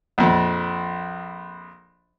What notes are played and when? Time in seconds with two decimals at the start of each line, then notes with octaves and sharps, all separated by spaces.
0.18 A#1 F2